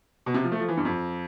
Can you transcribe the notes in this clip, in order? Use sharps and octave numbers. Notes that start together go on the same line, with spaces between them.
B2
C3
F3
A3
F3
E3
G2
F2